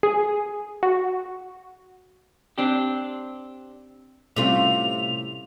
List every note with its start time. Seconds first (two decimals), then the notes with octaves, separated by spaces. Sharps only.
0.03 G#4
0.83 F#4
2.58 C4 D4 G4
4.36 A2 C3 G3 A3 C4 C#4 F4 F7